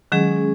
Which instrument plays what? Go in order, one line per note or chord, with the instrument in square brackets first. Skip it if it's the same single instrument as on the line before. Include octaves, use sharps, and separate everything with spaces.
[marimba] D#3 F#3 [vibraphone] G#3 C#4 G#4